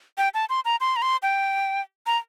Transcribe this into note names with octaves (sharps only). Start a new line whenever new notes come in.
G5
A5
C6
A#5
C6
A#5
C6
G5
A#5